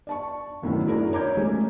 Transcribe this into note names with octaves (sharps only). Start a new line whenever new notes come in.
D5 A5 C#6
G1 F#2 A2 D#3 B3
F#3 D4 E4 G#4 A#4 D5
C#5 A#5 D6 G6 G#6
G#3 A3 C#4 A4